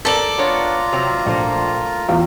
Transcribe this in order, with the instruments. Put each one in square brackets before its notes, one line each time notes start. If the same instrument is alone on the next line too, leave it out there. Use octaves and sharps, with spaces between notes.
[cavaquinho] A4 D5 [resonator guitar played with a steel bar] A#4 [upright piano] A6 F#7
[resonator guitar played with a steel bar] B3 D4 C#5 [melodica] F4 A#5
[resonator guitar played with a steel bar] C3 F#3 C4
[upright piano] A#1 [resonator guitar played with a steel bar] A3 A#3 C5
[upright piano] E2 F4 [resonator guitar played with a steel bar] G5